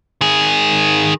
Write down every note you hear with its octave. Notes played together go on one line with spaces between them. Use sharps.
D#3 G#4